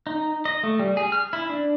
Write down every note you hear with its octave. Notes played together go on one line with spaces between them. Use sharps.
D#4
D#5
A3
G3
G#4
F6
E4
D4